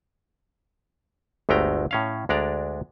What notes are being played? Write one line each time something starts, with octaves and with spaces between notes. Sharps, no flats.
G1 D2 G#3 A3 G5 A#5
A2 C#4 F5
D2 G#3 D4 D5 A#5